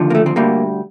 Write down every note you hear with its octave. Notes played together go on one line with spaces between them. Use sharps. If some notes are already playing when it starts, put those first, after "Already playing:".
Already playing: D#2 D3 F3
A#3
A3
C4
D2 D3 G3 A#3